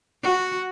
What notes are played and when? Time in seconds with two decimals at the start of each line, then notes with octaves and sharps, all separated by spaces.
0.23 F#4